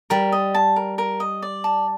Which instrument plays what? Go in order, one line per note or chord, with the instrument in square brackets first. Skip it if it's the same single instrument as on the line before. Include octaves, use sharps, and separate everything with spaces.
[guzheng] G3 [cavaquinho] A#4
[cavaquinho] D#5
A5
A#4
A#4
D#5
D5
A5